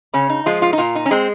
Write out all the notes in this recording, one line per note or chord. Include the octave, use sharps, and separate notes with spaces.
C#3 C#4
D#4
F3 G#3 F4
F4
D#4
A#2 F4
D#4
C#4
G#3 C4